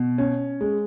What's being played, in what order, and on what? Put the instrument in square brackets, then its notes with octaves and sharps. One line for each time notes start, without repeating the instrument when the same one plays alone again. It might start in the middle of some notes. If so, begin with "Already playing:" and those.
Already playing: [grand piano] B2
C#4
G#3